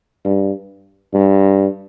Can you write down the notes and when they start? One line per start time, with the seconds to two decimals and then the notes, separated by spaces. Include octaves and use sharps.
0.25 G2
1.14 G2